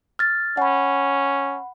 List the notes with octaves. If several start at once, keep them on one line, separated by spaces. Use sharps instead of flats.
F6 A6
C#4 F#5 B5